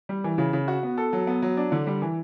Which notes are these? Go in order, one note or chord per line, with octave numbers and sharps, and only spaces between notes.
G3
E3
C#3
C#3
F#4
B3
A4
F#3
B3
F#3
D4
D3
G3
E3